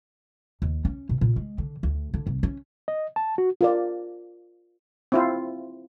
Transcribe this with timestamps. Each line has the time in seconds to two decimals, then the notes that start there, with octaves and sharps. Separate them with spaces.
0.62 D#2
0.85 C#4
1.09 B2
1.21 A#2
1.36 G#3
1.58 D3
1.83 D2
2.14 D3
2.27 C2
2.43 C#4
2.88 D#5
3.16 A5
3.38 F#4
3.61 F4 A#4 D5
5.12 C4 E4 F4